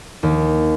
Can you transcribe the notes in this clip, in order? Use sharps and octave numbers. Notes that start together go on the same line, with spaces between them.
D#2